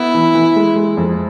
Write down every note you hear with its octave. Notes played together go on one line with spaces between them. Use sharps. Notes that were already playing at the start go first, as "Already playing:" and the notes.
Already playing: B3 E4
E3
E3
G#3
G#3
F2